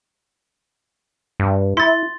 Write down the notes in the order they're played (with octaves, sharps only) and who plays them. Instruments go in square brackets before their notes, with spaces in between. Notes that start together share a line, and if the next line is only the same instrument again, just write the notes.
[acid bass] G2
[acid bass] E4 [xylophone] C6 A6